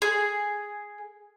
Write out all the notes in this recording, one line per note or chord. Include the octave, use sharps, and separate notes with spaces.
G#4